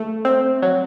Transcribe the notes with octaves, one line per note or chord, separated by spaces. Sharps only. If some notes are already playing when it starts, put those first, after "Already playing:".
Already playing: A3
C4
F#3